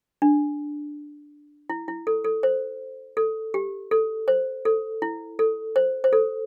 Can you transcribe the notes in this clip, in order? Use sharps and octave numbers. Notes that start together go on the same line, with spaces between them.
D4
E4
E4
A4
A4
C5
A4
G4
A4
C5
A4
E4
A4
C5
C5
A4